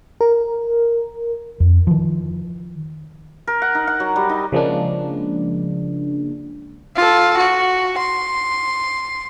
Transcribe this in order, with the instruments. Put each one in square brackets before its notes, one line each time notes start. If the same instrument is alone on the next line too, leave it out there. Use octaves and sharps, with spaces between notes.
[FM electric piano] A#4
[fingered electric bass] F2
D#3 F3
[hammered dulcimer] A#4
F#5
D#4
F#5
F#3
G3
D#4
[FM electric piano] C#3 F3 G#3 A#3 D4
[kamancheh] F4 A4
F#4
C6